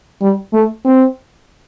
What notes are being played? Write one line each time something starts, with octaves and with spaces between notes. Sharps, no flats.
G3
A3
C4